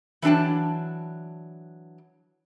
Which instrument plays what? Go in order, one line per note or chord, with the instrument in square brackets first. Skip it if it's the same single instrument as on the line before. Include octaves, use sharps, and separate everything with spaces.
[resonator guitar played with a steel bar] E3 F#3 D4 G5 A5